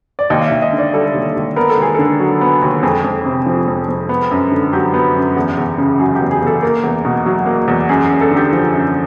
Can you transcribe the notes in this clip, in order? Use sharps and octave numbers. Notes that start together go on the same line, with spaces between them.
D5
D#2 D#5
F5
E5
D#2
D#5
D3
D5
G3 A4
D#2
D#2
B3 A#4
A4
D#2 G#4
D3 A4
F#3
B3
D#2
F2 G#4
F2
C3
F3
F2
F2
B3
F#2
D3
F#3 G4
B3
F#2
E2
E2
C#3
F#3 G#4
G4
E2
G#4
E2 A4
A#3 A#4
E2
B2
F#3
A#3
E2
F#2 G#4
G#4
F#2
A4
D3
G4
F3
F#2